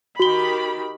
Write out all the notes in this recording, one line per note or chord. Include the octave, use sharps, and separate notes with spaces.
D#3 F#4 G4 B5 G7